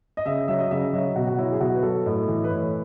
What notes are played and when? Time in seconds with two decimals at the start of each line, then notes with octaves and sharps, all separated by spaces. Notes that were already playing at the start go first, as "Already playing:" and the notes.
0.17 D#5
0.25 C#3 E5
0.48 F#3 E5
0.59 D#5
0.71 C#3 E5
0.93 F#3 D#5
1.16 B2 F#4
1.27 F#4
1.38 F#3 E4
1.52 G#4
1.60 B2 F#4
1.74 B4
1.83 F#3 A4
2.06 A2 D#5
2.28 E3
2.44 B4
2.50 A2 C#5